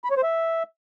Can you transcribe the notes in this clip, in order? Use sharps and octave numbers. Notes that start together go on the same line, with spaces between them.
B5
C#5
C5
E5